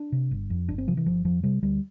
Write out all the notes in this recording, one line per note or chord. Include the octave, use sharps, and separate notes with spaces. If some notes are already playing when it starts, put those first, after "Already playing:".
Already playing: D4
C3
G1
F2
G1 D4
C4
C3 F3
E3
G1 F3
F2 F3
C3 G3
D2 G3